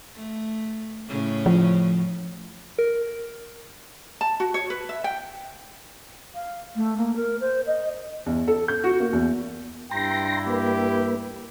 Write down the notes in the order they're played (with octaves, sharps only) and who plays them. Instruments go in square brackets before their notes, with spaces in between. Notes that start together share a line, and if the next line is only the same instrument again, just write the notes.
[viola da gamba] A3
A2 C#3 C#4
[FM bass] F3
[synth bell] A#4
[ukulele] A5
F#4
C#5
B4
E5
G5
[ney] F5
A3
A#3
A#4
C5
D#5
[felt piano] E2
A4
G6
F#4
A#3
E2
[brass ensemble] G2 E4 [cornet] G5 [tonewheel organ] A#5 C6 A#6
[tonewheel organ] A#3 B4 [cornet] G4